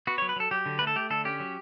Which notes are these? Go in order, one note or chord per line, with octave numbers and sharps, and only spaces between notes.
B3 F#4
C#5
F#3
B4
F#3 A4
F#3 G4
D3
A3 B4
A4
A3 G4
D3 A4
C#4 G4
F#3